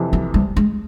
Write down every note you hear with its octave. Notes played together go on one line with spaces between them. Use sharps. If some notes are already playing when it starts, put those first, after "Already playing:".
Already playing: F2 C3 E3
F#3
G3
G#3